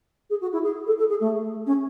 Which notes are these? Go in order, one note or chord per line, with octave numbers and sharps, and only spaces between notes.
G#4
F#4
E4
G#4
A4
A4
G#4
A3
C#4